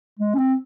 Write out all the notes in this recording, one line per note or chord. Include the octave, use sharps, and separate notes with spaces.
G#3
C#4
C4